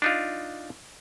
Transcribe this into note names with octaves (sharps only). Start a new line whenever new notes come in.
D4 D#4 F4